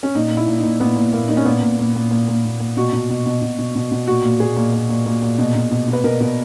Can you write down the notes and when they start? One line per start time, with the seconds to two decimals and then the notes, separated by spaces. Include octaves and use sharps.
0.03 C#4
0.15 A#2 D#4
0.31 A#2
0.37 E4
0.48 A#2
0.58 D#4
0.64 A#2
0.80 A#2 B3
0.96 A#2
1.13 A#2 A#3
1.28 A#2 D#4
1.37 C#4
1.45 A#2 B3
1.62 A#2
1.79 A#2
1.95 A#2
2.11 A#2
2.28 A#2
2.45 A#2
2.60 A#2
2.77 B2 F#4
2.93 B2
3.10 B2
3.26 B2
3.42 B2
3.59 B2
3.76 B2
3.92 B2
4.07 A#2 F#4
4.24 A#2
4.40 A#2 G#4
4.57 A#2
4.73 A#2
4.89 A#2
5.06 A#2
5.22 A#2
5.39 B2
5.55 B2
5.72 B2
5.88 B2
5.93 B4
6.04 B2 A#4
6.20 B2